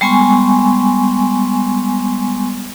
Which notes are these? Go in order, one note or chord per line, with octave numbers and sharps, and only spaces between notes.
G3 G#3 B3 G#5 C6 C#6